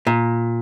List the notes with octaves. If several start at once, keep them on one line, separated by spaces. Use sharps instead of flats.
A#2